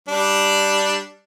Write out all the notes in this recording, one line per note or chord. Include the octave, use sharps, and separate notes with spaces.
G3 D4